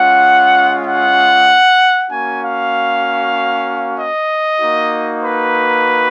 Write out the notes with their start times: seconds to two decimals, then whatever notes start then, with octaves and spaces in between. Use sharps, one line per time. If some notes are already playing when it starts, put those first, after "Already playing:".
Already playing: G#3 C#4 F4 F#5
0.85 F#5
2.10 A#3 C#4 F#4 G#5
2.42 F5
3.97 D#5
4.60 A#3 D#4 F#4
5.22 B4